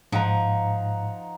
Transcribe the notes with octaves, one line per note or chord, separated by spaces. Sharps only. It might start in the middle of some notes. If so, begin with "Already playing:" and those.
G#2 F3 D#4 F#5 A#5